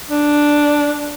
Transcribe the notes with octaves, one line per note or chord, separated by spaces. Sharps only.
D4